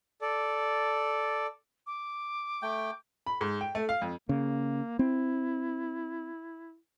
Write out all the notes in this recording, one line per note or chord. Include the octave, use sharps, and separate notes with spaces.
A4 D5
D6
A3 G5
B5
G#2
G5
A3
F5
F2
C#3 A#3
C4 E4